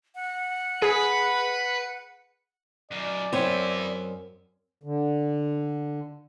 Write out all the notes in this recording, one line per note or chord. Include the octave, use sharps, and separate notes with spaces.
F#5
G#4 B4
F#2 D#3 D5
F#2 B3 C4 E4 C#5
D3